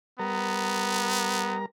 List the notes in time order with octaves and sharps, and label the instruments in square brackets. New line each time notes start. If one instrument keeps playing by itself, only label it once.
[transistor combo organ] G3 A#4 A#5 [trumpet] B3